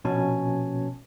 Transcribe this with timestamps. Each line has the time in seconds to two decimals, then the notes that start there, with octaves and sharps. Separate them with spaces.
0.04 A#1 B2 C#4 G#5 A5